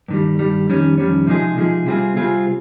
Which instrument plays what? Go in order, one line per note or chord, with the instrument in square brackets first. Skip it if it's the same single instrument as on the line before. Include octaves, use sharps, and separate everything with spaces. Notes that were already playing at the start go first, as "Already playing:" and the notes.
[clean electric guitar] G2 D#3 G3
G2 D#3 G3
F2 D#3 G3 C#4
F2 D#3 G3 C#4
C3 F3 G#3 D#4 G#4
C3 F3 G#3 D#4 G#4
C3 G3 C4 F4 G#4
C3 G3 C4 F4 G#4